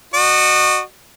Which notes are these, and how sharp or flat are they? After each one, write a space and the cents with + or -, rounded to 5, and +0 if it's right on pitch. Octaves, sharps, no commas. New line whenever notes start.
F#4 +0 D#5 -40